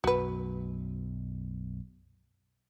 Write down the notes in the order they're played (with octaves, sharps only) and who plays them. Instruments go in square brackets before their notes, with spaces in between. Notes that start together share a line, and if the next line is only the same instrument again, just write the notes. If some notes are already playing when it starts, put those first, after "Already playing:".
[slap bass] B1 F#2 [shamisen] F#4 B4